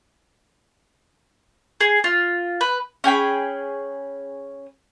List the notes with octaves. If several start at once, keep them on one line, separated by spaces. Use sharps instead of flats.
G#4
F4
B4
C#4 G#4 G5 B5